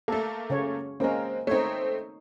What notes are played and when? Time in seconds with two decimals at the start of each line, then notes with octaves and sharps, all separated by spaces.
0.08 A3 A#3 A4
0.50 C#3 C#5
1.00 G#3 A#3 C4 C#4 A#4
1.47 A3 C4 D#4 C#5